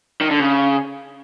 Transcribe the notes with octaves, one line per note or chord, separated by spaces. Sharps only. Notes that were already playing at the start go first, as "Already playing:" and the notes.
D#3
D3
C#3